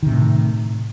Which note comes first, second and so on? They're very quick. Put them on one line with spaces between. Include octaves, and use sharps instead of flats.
D#3 C3 A2